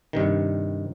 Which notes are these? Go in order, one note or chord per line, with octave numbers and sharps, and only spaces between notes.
G2 C3 D#3